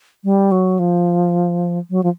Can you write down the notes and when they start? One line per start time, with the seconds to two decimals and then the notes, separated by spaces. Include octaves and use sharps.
0.24 G3
0.52 F#3
0.79 F3
1.90 F#3
2.03 F3